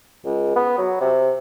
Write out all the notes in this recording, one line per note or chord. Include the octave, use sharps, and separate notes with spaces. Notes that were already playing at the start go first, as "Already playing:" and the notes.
C#2
B3
F#3
C3